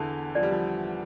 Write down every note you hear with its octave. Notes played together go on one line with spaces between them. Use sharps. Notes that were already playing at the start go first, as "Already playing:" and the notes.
Already playing: E2 D3 E3 A5
F3 D5
G3
F3